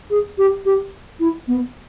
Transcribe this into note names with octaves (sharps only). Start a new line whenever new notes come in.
G#4
G4
G4
E4
B3